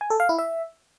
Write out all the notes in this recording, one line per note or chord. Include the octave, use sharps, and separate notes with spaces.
G#5
A4
F5
E4
E5